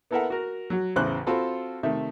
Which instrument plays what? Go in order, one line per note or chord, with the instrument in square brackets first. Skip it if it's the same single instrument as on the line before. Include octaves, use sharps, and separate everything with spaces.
[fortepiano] B3 E4 A4 A#4 E5 F#5
F#4 A#4
F#3 F#4
A1 E2 C#3 C5 F#6
C4 F4 F#4 A4 B5
C3 D#3 A3 E5